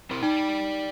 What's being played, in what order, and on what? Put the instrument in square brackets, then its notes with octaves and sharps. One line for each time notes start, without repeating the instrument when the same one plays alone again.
[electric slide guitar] C4 E4 A#4
[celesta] D#4 [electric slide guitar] D5 G5